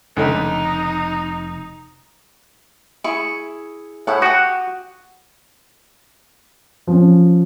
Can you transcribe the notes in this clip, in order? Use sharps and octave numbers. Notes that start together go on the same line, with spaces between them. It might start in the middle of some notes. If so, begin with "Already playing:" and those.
F1 C#2 D3 A3 D#4
E4 G#4 C#6
A2 E4 G#4 F#5
F#4 G4 D#6
F3 C#4